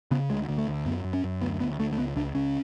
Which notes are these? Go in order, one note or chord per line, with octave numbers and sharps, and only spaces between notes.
C#3 B3
D2 G#3
D2
A3
D2
F#2 B3
F#2
C#4
F#2
D2 B3
D2 B3
D2 A3
A3
C#2 B3
C#2 D4
C#2 C#4